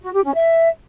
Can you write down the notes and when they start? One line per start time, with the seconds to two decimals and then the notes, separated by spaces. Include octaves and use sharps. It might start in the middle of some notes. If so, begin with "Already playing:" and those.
0.02 F#4
0.13 G4
0.24 C#4
0.35 E5